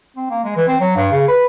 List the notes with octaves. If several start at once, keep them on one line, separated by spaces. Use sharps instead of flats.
C4
A#3
G#3
E3
C4
F#3
G2
C#3
B4